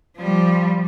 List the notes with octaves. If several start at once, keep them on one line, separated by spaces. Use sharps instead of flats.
F3 G3